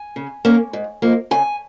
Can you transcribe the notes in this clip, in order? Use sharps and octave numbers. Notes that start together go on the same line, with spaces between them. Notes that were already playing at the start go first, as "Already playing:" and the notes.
Already playing: G#5
C#3
A#3 C#4
G#2
F3 A#3 D#4
C#3 G#5